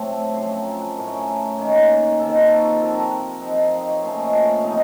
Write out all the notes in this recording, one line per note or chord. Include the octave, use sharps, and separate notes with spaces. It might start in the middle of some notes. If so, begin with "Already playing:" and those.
Already playing: A2 C3 F#3 A3 C4
F#2 C#3 F3 C4 C6
A#5
A5
F#5
A2 A3 C#4 A#4
D#3 A#3 C#4
C3 D#3 A#3 A4
F4
F#4
A4
C3 F3 C4 A#4
F#5
C3 F3 C4 D#4
F#5
F5
D#5
C#5
A#2 F3 A3 C#4 C5
D#5
F#5
F5
C3 F3 C4 D#4 D#5